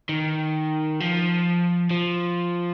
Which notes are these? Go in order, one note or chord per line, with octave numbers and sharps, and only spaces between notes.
D#3
F3
F3